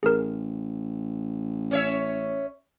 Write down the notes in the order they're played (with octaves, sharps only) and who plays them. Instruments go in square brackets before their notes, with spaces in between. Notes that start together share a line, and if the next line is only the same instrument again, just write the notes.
[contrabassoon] A1 [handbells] G#4 A#4
[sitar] C#4 C#5 E5